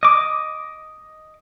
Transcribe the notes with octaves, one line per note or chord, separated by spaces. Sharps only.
D#5 D6